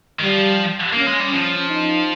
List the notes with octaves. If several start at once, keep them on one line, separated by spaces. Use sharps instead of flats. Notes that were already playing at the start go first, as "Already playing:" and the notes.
D#3
F3 G3
A#3 C#4
G#3
G3
F3 C#4
D#4